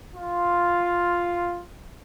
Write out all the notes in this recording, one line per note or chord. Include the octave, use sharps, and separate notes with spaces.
F4